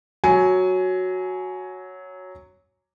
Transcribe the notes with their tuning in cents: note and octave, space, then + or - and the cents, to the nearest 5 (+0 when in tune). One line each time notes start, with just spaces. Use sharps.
F#3 +0 G#5 +15